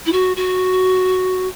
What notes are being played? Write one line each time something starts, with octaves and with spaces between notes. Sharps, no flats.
E4
F#4
F#4